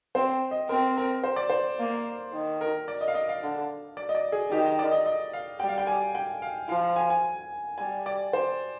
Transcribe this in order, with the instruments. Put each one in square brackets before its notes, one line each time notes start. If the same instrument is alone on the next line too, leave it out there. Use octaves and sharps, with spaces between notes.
[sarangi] C4 [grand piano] C5
[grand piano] D#5
[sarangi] C4 [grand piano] A#4
[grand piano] A#4
C5
D5
C5
[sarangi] A#3
D#3
[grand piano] A#4
D5
D#5
F5
D#5
F5
[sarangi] D3
[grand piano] D5
D#5
D5
G#4
[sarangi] D#3 [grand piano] G4
[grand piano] D#5
D5
D#5
D#5
F5
[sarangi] G3 [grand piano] G5
[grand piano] F5
G5
G#5
G5
F5
[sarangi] F3 [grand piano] F5
[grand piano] G#5
G#5
[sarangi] G3 [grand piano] G#5
[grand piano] D5
C5